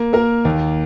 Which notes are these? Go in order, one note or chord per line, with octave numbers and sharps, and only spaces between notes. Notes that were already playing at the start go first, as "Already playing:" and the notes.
Already playing: A#3
A#3 A#4
D#2